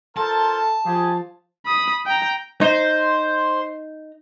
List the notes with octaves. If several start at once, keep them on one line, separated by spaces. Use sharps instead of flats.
F4 A4 A#4 C5 A5
F3 F4 G4 G#4
B5 D#6
G5 A#5
D#4 C5